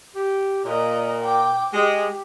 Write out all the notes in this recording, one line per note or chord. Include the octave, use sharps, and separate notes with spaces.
G4
A#2 D#5 A#5
G5 D6
G#3 G4